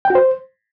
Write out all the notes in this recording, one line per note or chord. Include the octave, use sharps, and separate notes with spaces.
G5
F#4
C5